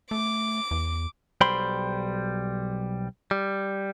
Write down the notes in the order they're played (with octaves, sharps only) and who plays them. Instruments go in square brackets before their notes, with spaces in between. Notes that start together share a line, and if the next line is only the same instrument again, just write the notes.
[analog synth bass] A3 [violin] D6
[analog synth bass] E2
[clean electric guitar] B1 G3 C5 G5 B5 C6
G3